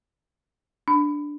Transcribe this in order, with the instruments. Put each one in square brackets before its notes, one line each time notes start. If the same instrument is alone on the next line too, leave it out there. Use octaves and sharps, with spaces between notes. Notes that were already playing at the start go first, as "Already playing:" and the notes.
[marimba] D4